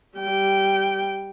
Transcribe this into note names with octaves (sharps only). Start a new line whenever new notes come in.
G3 G5